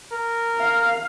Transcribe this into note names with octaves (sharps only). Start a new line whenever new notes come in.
A#4
F5